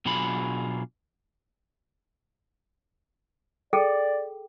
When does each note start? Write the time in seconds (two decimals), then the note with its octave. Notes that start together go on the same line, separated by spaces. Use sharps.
0.05 B2 F#3 D4 F4 G#4 B5
3.73 G#4 A4 D5 G5